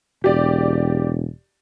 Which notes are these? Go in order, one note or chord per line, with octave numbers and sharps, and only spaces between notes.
E1 G4 D5